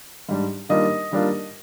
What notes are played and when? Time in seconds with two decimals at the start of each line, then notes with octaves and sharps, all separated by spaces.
0.29 G#2 G3 D4
0.69 D#3 G3 A#3 D4 F4 D#5
1.11 D#3 G3 A#3 D4 F4